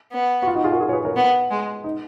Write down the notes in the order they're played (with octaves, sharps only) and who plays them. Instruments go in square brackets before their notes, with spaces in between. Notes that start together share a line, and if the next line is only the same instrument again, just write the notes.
[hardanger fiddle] B3
[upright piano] F#4
F4
D#4 F#4
F4 G#4
F#4 A#4
F4 G#4
C#5
G#4 B4
A#4 C#5
[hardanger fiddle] B3
G#3
[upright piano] D#4